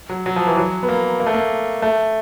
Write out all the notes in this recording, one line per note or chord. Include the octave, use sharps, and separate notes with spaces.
F#3
F#3
F3
E3
F#3
B3
A#3
A#3
A3
A#3
A3